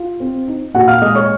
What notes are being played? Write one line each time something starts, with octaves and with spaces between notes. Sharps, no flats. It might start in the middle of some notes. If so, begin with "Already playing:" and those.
Already playing: F4
C4
D#4
A#2 F#4 F#5
F5 F6
G#3 D#5 D#6
C#5 C#6